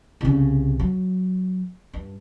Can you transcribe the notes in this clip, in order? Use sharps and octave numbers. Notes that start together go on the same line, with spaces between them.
C2 C#3
F#3
G2